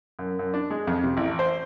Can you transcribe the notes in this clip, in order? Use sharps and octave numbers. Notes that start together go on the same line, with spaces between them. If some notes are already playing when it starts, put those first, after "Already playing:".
F#2
F#2
D4
G#3
F2
C3
A1
C5